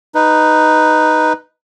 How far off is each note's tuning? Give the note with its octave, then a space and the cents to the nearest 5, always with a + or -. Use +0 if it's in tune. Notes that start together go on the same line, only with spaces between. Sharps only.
D#4 +0 B4 +0